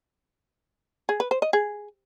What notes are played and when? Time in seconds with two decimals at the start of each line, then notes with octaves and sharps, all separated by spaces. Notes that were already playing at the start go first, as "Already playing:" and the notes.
1.09 G#4
1.20 B4
1.31 C5
1.42 D#5
1.53 G#4